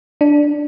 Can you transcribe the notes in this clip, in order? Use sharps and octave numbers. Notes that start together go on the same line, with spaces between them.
D4